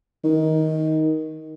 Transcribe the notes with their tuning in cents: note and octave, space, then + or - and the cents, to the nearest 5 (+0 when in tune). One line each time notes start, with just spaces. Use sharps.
D#3 +15